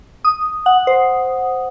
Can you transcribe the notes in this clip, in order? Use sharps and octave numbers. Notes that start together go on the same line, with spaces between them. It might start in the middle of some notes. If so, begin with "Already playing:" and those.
D#6
F#5
C5